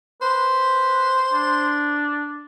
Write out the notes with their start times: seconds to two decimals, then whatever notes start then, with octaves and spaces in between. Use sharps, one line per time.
0.22 B4 C5
1.33 D4